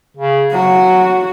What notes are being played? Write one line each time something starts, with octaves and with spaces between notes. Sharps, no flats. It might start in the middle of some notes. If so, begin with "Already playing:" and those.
C#3
F#3 F#4